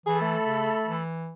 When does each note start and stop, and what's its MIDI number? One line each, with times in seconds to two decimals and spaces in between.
0.06 0.37 52
0.06 0.17 68
0.06 1.01 69
0.06 1.01 83
0.21 1.00 57
0.46 0.70 49
0.86 1.33 52